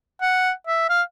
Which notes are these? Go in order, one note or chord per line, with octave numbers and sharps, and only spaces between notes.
F#5
E5
F5